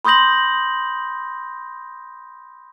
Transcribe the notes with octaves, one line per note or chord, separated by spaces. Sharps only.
B5 C6 D#6 G6 A#6 F#7